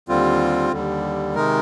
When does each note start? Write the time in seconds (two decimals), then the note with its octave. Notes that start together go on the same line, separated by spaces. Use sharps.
0.09 D#2 D3 G3 C4 F4
0.72 D#2 D3 G3
1.35 C3 D#3 G#3 D#4 A#4